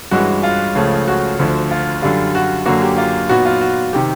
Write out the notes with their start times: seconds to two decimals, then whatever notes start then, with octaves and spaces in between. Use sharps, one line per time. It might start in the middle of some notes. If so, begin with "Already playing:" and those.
0.11 G2 E3 G#3 C#4 E4 F#4
0.43 F4
0.75 C#2 C#3 F3 A3 C#4
1.08 F#4
1.39 D2 D3 F3
1.71 F4
2.02 F#2 D3 G3 F4
2.35 F#4
2.66 F#2 D3 F#3 A#3 F#4
2.82 G4
2.98 F4
3.29 A#2 F#3 B3 D#4 F#4
3.45 F4
3.61 F#4
3.93 C3 D#3 G4